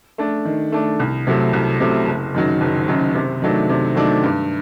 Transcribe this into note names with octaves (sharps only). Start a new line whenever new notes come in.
A3 D4
D#3
A3 D4
C2
C3 F#3 A3
C2
C3 F#3 A3
F#1
F#2 D#3 F#3
F#1
F#2 D#3 F#3
C3
D#3 F#3 A3 D4
C3
D#3 F#3 A3 D4
G2